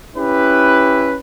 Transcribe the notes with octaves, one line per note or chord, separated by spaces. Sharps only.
C#4 E4 G4 B4